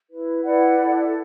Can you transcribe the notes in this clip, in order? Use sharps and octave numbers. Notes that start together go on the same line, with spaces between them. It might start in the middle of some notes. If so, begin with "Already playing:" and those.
E4 B4
E4 B4 D5 F#5
E4 A4